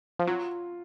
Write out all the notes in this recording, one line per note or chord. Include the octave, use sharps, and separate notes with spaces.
F3
F#3 F4